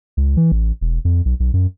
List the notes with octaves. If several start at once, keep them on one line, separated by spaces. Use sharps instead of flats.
C#2
E3
A1
E1
F2
B1
B1
F#2